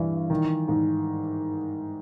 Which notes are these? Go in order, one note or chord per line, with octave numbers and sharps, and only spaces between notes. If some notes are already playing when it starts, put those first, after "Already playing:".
Already playing: G2 E3
D#3
G#2